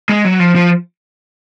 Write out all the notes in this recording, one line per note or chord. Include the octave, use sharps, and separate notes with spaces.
G#3
F#3
F3
F3